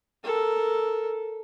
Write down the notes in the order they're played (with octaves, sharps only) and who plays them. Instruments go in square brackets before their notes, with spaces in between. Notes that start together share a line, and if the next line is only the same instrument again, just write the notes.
[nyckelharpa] A4 A#4